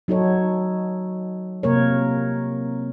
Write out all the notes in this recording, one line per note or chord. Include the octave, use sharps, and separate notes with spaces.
F#3 D#4 F#4 A4 C#5
C3 A#3 A#4 C#5